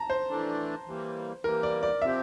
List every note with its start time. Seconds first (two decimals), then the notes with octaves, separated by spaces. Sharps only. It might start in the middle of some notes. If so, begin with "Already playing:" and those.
Already playing: A5 A#5
0.10 C5
0.29 E3 A3 D4
0.87 E3 G3 A#3
1.44 E3 G3 A#3 A#4
1.63 D5
1.83 D5
2.02 C3 F3 C4 G4 E5